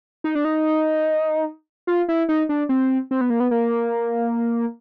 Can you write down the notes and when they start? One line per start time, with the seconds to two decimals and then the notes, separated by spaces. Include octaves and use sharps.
0.24 D#4
0.35 D4
0.45 D#4
1.87 F4
2.09 E4
2.29 D#4
2.49 D4
2.69 C4
3.11 C4
3.21 B3
3.30 A#3
3.40 B3
3.51 A#3